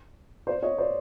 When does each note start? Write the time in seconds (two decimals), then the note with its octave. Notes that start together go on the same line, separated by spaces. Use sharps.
0.47 C5 D5
0.63 C#5 D#5
0.78 C5 D5